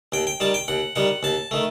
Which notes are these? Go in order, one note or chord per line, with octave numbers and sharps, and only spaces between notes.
D#2 G5
G5
D#3 G3 A5
G5
D#2 F#5
D#3 G3 F#5
D#2 A5
D#3 A3